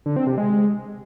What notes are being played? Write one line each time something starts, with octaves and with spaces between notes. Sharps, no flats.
D3
C4
C3
G#3